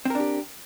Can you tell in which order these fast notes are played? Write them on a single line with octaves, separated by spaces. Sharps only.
C4 A#4 D4 G4